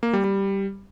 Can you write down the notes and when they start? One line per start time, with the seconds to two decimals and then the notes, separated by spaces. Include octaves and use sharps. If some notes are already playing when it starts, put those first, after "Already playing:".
0.03 A#3
0.13 G3
0.24 G3